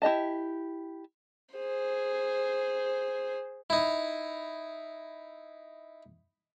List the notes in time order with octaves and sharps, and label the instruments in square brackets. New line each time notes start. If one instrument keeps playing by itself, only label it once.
[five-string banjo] E4 G4 D#5 A5
[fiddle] G#4 C5
[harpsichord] D#4 E4